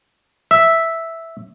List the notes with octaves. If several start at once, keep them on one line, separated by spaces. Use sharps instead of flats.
E5